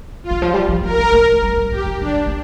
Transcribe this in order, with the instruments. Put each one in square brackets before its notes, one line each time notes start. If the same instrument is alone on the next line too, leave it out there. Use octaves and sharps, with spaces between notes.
[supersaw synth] F4
[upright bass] D3
F3
G3
F3
[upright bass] F3 [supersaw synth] A#4
[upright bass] G3
A#3
A#3
G3
G3
[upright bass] F3 [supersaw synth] G4
[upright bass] F3
[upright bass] F3 [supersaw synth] D4
[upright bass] G3
A#3